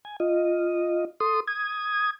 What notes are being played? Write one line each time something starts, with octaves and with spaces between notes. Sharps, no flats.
G#5
F4 D#5
A4 C6 D#6
D#6 G#6